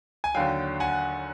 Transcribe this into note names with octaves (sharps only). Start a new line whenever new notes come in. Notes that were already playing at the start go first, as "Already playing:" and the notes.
G#5
D#2 D3 F#3 F5 G5
F#5 G#5